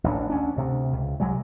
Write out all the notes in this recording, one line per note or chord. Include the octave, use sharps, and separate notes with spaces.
A1 D2 A#3 D4
D2 C#4 D4
D2 C3
C#2
C2 C3 F#3 G#3